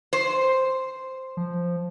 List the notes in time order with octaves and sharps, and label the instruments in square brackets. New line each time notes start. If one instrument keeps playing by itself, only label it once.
[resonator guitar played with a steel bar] C5
[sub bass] F3